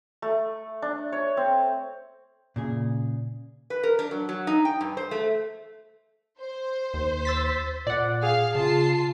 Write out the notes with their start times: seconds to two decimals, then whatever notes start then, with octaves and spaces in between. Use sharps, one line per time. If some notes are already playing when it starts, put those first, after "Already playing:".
0.22 A3
0.82 D4
1.12 C#5
1.37 C4
2.56 A#2 C#3 G#4
3.70 B4
3.83 A#4
3.99 D4
4.11 F#3
4.29 F#3
4.47 D#4
4.65 G5
4.81 G2
4.97 C5
5.11 A3
6.41 C5
6.94 D#2
7.25 E6 A6 B6
7.87 A#2 D5 F#5
8.23 G#4 F5
8.55 C#3 F4 A5 C7